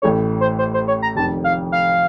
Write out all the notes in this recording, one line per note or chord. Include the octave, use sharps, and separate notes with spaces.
A1 A2 A3 C#5
C5
C5
C5
C#5
A#5
F1 F2 D#3 A5
F5
F5